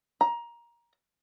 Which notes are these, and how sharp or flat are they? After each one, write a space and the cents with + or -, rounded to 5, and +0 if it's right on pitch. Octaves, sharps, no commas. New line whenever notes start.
A#5 +15